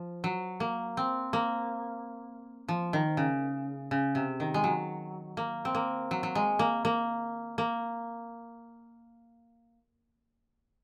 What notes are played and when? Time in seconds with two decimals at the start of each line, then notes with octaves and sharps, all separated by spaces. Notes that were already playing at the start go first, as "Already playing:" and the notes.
Already playing: F3
0.24 F#3
0.60 A#3
0.97 C4
1.33 A#3
2.68 F3
2.93 D#3
3.17 C#3
3.91 C#3
4.15 C3
4.40 D#3
4.54 G#3
4.64 F#3
5.37 A#3
5.65 C4
5.75 A#3
6.11 F#3
6.23 F#3
6.35 G#3
6.59 A#3
6.85 A#3
7.58 A#3